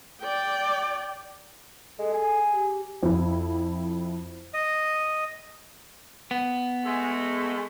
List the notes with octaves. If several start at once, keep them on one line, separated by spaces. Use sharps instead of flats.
D5 G5
G#3 A4
G#4
G4
F2 E4
D#5
B3
G#3 A3